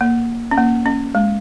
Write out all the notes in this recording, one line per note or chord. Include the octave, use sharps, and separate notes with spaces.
A#3
C#4
A#3
C#4
G#3